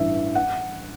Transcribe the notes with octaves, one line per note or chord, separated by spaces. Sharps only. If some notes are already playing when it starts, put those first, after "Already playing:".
Already playing: A1 G2 E3 E5
F#5